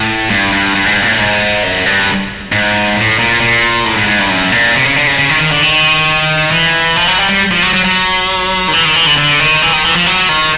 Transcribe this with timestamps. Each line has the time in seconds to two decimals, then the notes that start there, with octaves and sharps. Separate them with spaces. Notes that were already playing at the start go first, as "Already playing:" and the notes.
Already playing: A2
0.30 G2
0.52 G2
0.75 G2
0.86 G#2
0.97 G2
1.02 A#2
1.08 A2
1.19 G#2
1.63 F#2
1.86 G2
2.52 G#2
2.96 A2
3.19 A#2
3.41 A#2
3.85 A2
3.96 G#2
4.08 G#2
4.19 G2
4.30 F#2
4.52 A#2
4.74 C3
4.85 C#3
4.96 D3
5.07 C#3
5.19 C#3
5.29 D#3
5.40 D#3
5.52 D3
5.63 D#3
6.51 E3
6.96 F3
7.07 F#3
7.18 G3
7.29 G3
7.51 F3
7.62 F#3
7.74 F#3
7.85 F#3
8.68 D#3
8.73 E3
8.85 D#3
8.96 E3
9.07 D3
9.18 D3
9.40 D#3
9.62 E3
9.73 D#3
9.84 E3
9.96 F3
10.06 F#3
10.29 D#3